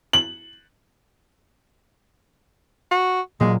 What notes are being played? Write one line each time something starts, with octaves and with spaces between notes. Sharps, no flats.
F#7
F#4
A#2 F#3 G#3 A#3